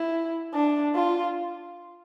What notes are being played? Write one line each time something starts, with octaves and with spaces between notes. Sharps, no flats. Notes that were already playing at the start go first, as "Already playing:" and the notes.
Already playing: E4
D4
F4